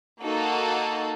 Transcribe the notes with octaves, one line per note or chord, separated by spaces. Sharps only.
A#3 D#4 F#4 A4